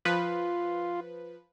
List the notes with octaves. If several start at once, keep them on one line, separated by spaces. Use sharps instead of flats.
F3 F4 B4